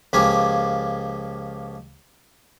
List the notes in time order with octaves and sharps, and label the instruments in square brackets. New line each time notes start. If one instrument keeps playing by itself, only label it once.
[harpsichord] C#2 F3 A#3 G4 G#5